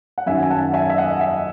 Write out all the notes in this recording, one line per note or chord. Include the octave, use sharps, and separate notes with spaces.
F#5
F#2 D#3 F#3 E5 G#5
G#5
F#5 A5
E5 G#5
E5
D#5 F#5
E5